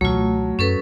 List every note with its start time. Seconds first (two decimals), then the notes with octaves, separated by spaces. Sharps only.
0.01 C#2 B2 E3 F#3 A3 F4
0.59 F#2 C#4 A4 B4